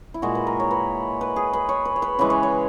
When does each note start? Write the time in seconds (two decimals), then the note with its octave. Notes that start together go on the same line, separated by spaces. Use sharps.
0.14 E4
0.22 A#2 G#3 F#4
0.35 B4
0.47 A#4
0.60 C#5
0.71 B4
1.21 B4
1.36 G#4
1.53 B4
1.69 C#5
1.85 B4
1.96 C#5
2.02 B4
2.19 C#3 E3 G#3 B4
2.30 C#5
2.43 C#5